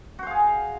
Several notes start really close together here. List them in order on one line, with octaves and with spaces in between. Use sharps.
F#4 C5 F5 G#4